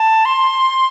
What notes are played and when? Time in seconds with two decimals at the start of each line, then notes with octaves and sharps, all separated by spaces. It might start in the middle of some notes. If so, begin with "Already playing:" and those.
Already playing: A5
0.25 C6